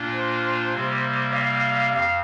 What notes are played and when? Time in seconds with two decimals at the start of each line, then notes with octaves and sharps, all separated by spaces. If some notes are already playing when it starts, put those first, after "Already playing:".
Already playing: A#2 A#3 D4 F4
0.12 C5
0.73 C3 G3 A#3
1.33 F5
1.93 F2 F5